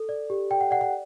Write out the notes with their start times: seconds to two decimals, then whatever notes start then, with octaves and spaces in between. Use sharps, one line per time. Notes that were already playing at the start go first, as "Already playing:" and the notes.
Already playing: A4
0.09 D5
0.30 G4
0.51 D5 G5
0.61 F#5
0.71 D5 F#5
0.81 F#5